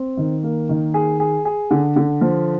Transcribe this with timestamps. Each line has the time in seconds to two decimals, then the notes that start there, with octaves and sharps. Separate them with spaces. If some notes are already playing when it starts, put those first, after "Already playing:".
Already playing: C4
0.17 D#3
0.43 A#3
0.69 D#3
0.94 G#4
1.20 G#4
1.45 G#4
1.71 D3
1.96 D3
2.21 F3